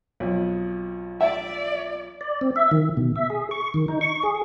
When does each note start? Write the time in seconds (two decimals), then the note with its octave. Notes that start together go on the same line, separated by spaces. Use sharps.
0.20 B1 F2
1.21 D5 E5
2.21 D5
2.41 C4
2.56 E5
2.71 D#3
2.97 B2
3.16 E5
3.30 G#4
3.51 C#6
3.74 D#3
3.88 D#4
4.01 C#6
4.23 G#4